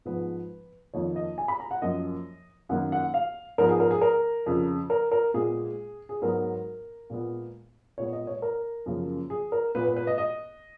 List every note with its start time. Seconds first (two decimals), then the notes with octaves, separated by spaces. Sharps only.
0.05 G#2 F3 G#3 B3 B4
0.94 F2 D#3 A#3 C#5
1.16 D#5
1.38 G#5
1.48 B5
1.60 A#5
1.71 F#5
1.82 F#2 F3 A#3 D#5
2.69 F#2 D#3 A#3 F#5
2.92 F#5
3.14 F5
3.58 G#2 F3 B3 A#4
3.69 G#4
3.80 A#4
3.91 G#4
4.01 A#4
4.46 F2 C#3 F3
4.90 A#4
5.12 A#4
5.34 A#2 G#3 B3 G#4
6.09 G#4
6.22 G#2 F#3 B3 A#4
7.10 A#2 G#3 B3
7.98 A#2 G#3 B3 C#5
8.13 D#5
8.27 C#5
8.42 A#4
8.86 F#2 C#3 F3 A#3
9.30 G#4
9.52 A#4
9.75 A#2 G#3 B3 B4
9.86 B4
9.96 B4
10.07 D#5
10.18 D#5